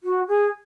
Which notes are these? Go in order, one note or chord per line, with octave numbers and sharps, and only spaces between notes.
F#4
G#4